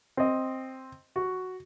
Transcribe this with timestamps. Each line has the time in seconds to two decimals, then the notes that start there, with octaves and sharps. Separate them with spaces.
0.17 C4 D#5
1.16 F#4